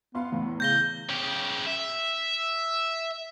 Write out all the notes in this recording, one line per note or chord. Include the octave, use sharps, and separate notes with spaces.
B3 F5 C6
E2 A2
C#3 G6 A#6 G7
C#3 G4
E5